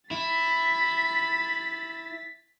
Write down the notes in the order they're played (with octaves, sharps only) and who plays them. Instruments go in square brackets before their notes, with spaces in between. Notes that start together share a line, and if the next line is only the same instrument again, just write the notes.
[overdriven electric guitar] E4 [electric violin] A6 B6